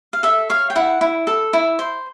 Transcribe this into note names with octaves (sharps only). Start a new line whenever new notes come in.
F5
A4 E5
C#5 F5
G5
E4 F#5
E4
A4
E4
C5